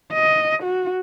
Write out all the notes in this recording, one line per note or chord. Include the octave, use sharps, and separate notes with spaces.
D#5
F#4